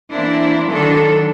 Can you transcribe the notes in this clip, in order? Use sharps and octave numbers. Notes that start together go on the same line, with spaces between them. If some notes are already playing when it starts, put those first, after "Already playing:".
E3 A#3 C4 D4 E4
D3 D#3 F#3 D4 A4